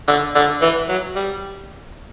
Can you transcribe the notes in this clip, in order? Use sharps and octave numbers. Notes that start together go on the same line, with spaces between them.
D3
D3
E3
F#3
G3